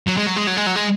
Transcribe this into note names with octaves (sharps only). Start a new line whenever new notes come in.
F#3
G#3
F#3
G#3
F#3
G#3
F#3
G#3